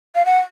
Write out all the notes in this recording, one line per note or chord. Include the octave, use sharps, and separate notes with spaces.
F5
F#5